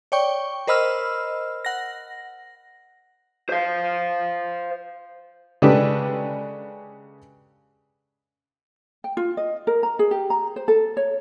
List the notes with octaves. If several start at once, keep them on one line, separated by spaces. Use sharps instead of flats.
C#5 D5 G5 C#6
A#4 C5 D#5 B5 E6 F6
F#5 A#6
C5 F5
C#3 G#3 D4 G4 A4 B4
G5
F4
D#5
A#4
A#5
G#4
G4
A#5
C5
A4
C#5